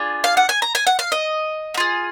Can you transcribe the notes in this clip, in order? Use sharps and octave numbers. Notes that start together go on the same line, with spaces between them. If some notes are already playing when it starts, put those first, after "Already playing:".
Already playing: D4 F4 G#4
F5
F#5
G#5
A#5
G#5
F#5
F5
D#5
A#3
F4 G#4